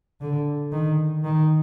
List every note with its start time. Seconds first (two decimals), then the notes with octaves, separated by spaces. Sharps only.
0.21 D3
0.72 D#3
1.24 D#3